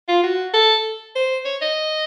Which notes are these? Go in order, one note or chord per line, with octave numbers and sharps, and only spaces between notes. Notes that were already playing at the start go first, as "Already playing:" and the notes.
F4
F#4
A4
C5
C#5
D#5